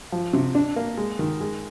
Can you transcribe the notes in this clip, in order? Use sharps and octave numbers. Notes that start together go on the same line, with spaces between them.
F3
C3
D4
A#3
G#3
D#3
G#3